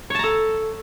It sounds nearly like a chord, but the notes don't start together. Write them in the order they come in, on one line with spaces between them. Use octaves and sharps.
C#5 A5 A#5 A4